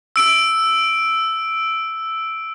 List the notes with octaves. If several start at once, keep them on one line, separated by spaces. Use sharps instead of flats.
E6 D7